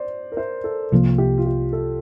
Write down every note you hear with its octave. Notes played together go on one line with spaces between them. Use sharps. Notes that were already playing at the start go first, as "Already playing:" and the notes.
Already playing: C5 D5
A#4
C5
A4
C2 C3 F3 A#3 F4
G4
F4
G4
A4